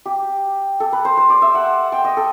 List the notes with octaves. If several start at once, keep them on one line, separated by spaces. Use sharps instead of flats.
G4
A4
B4
C5
C5
D5
E5
F#5
G5
D#5
A4